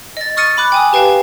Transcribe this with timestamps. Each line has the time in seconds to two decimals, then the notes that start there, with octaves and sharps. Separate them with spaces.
0.17 D#5 A6
0.37 C#6 D#6 F6 A6 C#7 D#7
0.57 B5 D6 F#6
0.72 G5 G#5 D#6
0.93 G4 B4 F5 G5 A5